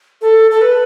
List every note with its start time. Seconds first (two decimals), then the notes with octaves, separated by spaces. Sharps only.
0.22 A4
0.51 A4
0.61 B4